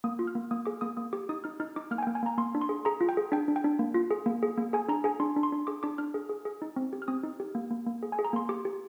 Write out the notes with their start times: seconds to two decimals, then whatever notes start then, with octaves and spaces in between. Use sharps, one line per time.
0.04 A#3 D#6
0.19 F4
0.27 F6
0.35 A#3
0.51 A#3 D#6
0.66 G#4 D6
0.81 A#3 D#6
0.97 A#3 D#6
1.13 G4 D6
1.29 D#4 D#6
1.44 D#4 F6
1.60 D#4 F6
1.76 D#4 D6
1.91 A#3 F6
1.98 G#5
2.03 G5
2.07 A#3
2.15 G#5
2.23 A#3 A#5
2.38 A#3 C6
2.55 D4
2.61 C6
2.69 G#4
2.85 G#4 A#5
3.01 F4
3.09 G5
3.17 G#4
3.32 D4 G5
3.48 D4
3.56 G5
3.64 D4
3.79 A#3
3.94 F4
4.11 G#4
4.26 A#3
4.43 G#4
4.58 A#3
4.73 G#4 G#5
4.88 D4 A#5
5.04 G#4 G#5
5.20 D4 C6
5.37 D4
5.43 C6
5.52 D4
5.67 G#4 D6
5.83 D4 D6
5.98 D4 F6
6.14 G#4
6.29 G#4
6.45 G#4
6.62 D#4
6.76 C4
6.93 G4
7.02 F6
7.08 C4 D#6
7.23 D#4
7.40 G4
7.55 A#3
7.70 A#3
7.86 A#3
8.03 G#4
8.12 G#5
8.19 G#4
8.25 A#5
8.33 A#3 C6
8.49 G4 D6
8.65 G4